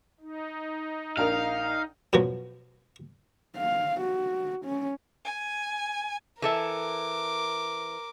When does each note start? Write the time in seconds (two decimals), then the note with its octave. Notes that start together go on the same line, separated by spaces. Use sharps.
0.20 D#4
1.17 A#1 A#4 F5 F7
2.13 F#2 B2 F3 F#3
3.57 F5
4.00 F#4
4.65 C#4
5.24 G#5
6.42 E3 A4 A#4 E5 D6